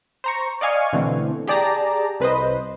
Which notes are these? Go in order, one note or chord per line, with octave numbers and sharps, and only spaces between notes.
C5 A#5 C#6
D5 D#5 F5 G#5 C#6
B2 D3 E3 A3 C4
G4 G#4 D5 A5 A#5
C2 B4 C5 D#5